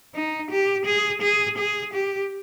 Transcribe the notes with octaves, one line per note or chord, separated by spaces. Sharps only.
D#4
G4
G#4
G#4
G#4
G4